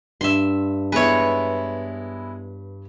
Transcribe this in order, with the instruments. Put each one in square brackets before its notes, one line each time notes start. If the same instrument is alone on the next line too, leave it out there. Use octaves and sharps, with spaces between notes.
[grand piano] G2 [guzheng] E5 C6
[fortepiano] G#3 B3 E4 [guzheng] B4 C#5